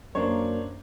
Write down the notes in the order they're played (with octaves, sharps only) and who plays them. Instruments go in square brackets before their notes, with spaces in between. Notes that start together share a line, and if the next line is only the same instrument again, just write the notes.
[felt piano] F#2 [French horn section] A#3 [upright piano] D4 C5 C#5